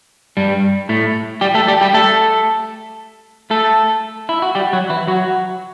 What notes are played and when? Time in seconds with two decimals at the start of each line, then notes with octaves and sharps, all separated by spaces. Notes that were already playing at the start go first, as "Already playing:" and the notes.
0.37 G2 G3
0.89 A2 A3
1.41 G3 G4
1.54 A3 A4
1.67 G3 G4
1.81 G3 G4
1.94 A3 A4
3.50 A3 A4
4.29 E4
4.42 F#4
4.55 G3 G4
4.73 F#3 F#4
4.90 E3 E4
5.07 F#3 F#4